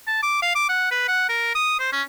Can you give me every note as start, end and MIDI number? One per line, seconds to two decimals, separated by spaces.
0.07 0.18 81
0.23 0.42 86
0.42 0.54 77
0.55 0.69 86
0.69 0.89 78
0.91 1.06 71
1.08 1.25 78
1.29 1.54 70
1.55 1.75 87
1.80 1.89 72
1.92 2.02 61